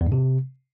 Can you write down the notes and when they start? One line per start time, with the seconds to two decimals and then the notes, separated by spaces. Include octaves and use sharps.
0.01 E2
0.06 G#2
0.12 C3